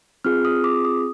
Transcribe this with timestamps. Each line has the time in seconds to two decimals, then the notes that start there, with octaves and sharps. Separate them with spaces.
0.25 C4 F4 G#4 F6
0.45 D#6
0.64 D6
0.85 D#6